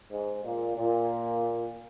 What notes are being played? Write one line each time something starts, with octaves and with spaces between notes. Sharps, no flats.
G#2
A#2
A#2